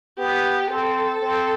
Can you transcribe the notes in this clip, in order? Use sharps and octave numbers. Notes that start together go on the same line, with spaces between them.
B3 G4
C4 A4
C4